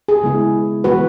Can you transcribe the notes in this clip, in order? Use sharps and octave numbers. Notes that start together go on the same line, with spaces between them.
G#4
C#3 G#3 B3 E4
E3 G#3 B3 F#4 B4